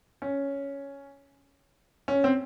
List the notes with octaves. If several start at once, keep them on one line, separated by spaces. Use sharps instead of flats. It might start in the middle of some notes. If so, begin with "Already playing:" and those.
C#4
C#4
C4